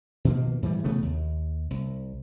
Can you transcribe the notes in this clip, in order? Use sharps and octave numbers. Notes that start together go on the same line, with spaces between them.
B2 D#3 F3 A#3
G#2 E3 F3 G3
C3 E3 A3 B3
D#2
C2